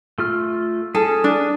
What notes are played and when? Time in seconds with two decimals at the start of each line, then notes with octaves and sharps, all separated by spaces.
0.18 A3 F4 F6
0.95 C#4 G#4 A4
1.24 D4